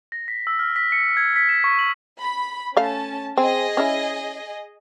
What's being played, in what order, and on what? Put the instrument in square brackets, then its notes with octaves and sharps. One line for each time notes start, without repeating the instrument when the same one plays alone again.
[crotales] A#6
B6
E6
F6
B6
C#7
G#6
B6
E7
C#6
F#7
[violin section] B5
[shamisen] A3 F5 [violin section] C#4 A5
[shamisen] C4 [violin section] G#4 D#5
[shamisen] C#4 E4